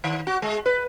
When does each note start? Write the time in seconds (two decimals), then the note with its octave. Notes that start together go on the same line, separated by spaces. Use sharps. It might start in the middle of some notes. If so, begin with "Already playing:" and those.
0.04 D#3
0.27 F#4
0.42 G#3
0.66 B4